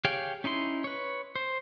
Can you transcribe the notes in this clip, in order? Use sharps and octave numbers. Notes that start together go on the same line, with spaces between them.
G4 G#4 C#5 F5 G5
C#4 D#4 E4 C6
B4 C#5
C5